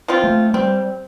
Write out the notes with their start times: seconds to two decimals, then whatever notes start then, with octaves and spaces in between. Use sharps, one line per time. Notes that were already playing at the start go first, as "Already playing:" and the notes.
0.08 F3 C4 F4
0.24 A3
0.54 G3 C4